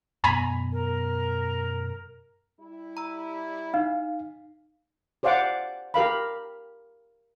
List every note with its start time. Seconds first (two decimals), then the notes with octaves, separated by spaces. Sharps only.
0.24 F#2 B2 B3 G#5 A#5 B5
0.72 A#4
2.60 G3 E4
2.97 A#5 E6
3.74 D#4 F5
5.23 G4 C5 D5 F5 F#5 D6
5.94 G4 A#4 F5 B5